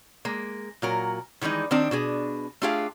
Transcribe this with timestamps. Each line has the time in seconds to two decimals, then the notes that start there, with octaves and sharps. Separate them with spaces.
0.25 G#3 A#3
0.82 A#2 F#3 A#4
1.41 D#3 E3 G3 G#3 D#4
1.71 D#3 C4 D4 G4
1.91 B2 D4 G#4
2.62 A3 D4 F4 G4 G#4 F5